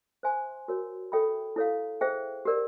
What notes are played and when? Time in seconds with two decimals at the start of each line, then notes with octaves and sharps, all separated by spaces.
0.23 C5 E5 G#5 C6
0.68 F#4 A#4 C#5
1.12 A4 C#5 E5 G5 B5
1.56 E4 A4 C#5 F5
2.01 G#4 C5 E5 G5
2.45 G4 A#4 D5